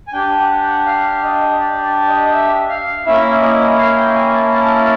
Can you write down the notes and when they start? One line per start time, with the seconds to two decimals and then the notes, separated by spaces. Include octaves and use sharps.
0.08 G#5
0.13 D4 G4 G5
0.38 F#5
0.62 F#5
0.87 F5
1.23 D#5
1.60 D5
1.84 D5
2.08 D#5
2.33 E5
2.69 F5
3.06 A#3 C#4 E4 E5
3.42 D#5
3.78 F5
3.97 G5
4.15 G#5
4.34 A5
4.52 A5